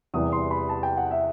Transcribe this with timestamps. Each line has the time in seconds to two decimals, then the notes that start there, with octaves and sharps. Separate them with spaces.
0.14 E2 C3 E3 G3 D#6
0.32 C6
0.51 B5
0.69 A5
0.83 G5
0.97 F#5
1.11 E5